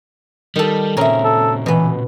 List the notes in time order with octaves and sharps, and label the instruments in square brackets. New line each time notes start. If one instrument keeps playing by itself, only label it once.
[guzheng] D#3 A4 [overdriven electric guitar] G3
[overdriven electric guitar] A#2 C#3 [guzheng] C4 C#4 G#4 [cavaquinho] A#4 E5
[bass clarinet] A4
[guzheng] B2 B3 [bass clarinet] E3